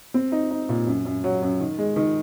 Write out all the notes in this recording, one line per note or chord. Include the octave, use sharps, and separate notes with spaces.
C4
D#4
D#4
A#2
F#2
F#2
F#3
F#2
D#3
G#3
D#3